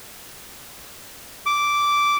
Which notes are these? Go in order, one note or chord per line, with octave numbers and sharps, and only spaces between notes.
D6